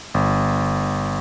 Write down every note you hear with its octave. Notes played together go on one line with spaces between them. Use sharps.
G1